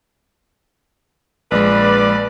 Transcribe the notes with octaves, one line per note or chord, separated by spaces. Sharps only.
A#1 G#3 B4 D5